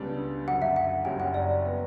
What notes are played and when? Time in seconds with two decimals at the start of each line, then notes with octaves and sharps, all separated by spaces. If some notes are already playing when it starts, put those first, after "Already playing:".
Already playing: C#2 C#3 G3 B3 D4
0.47 F#2 D3 F#3 F#5
0.62 E5
0.76 F#5
1.05 F#1 F#2 C#3 G3 C#4 G5
1.20 F#5
1.34 D5
1.64 F#3 B3 F#4 B4